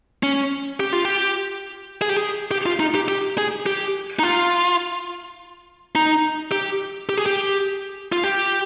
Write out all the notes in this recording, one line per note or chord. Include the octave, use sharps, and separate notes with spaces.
C#4
G4
F4
G4
G#4
G4
G#4
G4
F4
D#4
G4
G4
G#4
G4
D#4
F4
D#4
G4
G4
G#4
G4
F4
G4